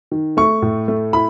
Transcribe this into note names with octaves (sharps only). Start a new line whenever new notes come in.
D#3
A3 C#6
A2
A3
E4 B5